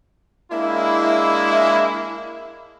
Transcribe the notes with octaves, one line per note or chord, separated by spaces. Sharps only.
G#3 A#3 D4 E4